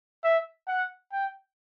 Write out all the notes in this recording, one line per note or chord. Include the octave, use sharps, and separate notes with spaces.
E5
F#5
G5